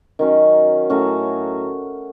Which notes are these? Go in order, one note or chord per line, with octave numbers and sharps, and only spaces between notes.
D#3 F#3 C#4
A2 F#3 C#4 F#4